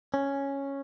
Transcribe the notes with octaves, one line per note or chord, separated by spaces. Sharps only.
C#4